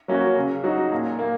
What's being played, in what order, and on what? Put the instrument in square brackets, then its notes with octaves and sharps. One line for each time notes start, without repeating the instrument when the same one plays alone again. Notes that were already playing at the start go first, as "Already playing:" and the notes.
[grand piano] F#3 A#3 C#4 F#4
C#3
F#3 D#4 F#4
A#2
A#3